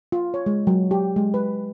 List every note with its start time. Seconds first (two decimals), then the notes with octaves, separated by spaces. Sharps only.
0.12 F4
0.34 C#5
0.46 G#3
0.67 F#3
0.91 G4
1.16 G#3
1.34 B4